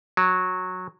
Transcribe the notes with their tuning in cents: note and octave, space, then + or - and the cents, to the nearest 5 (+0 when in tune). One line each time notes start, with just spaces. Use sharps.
F#3 -15